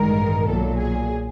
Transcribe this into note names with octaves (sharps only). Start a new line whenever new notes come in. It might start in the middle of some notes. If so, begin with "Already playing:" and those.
Already playing: A1 G2 D#3 G#3 A#4
B1 A#2 F#3 A4
G#4